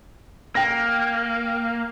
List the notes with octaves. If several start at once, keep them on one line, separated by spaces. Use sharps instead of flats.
A#3 G5 A#6